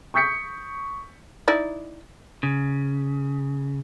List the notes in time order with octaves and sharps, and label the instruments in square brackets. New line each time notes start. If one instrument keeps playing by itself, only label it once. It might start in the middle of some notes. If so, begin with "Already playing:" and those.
[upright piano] C#6 D#6 G6 B6 C#7
[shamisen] D#4 E4 D5
[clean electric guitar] C#3